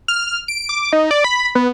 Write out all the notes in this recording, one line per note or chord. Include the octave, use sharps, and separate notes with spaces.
F6
D7
D6
D#4
D5
B5
B3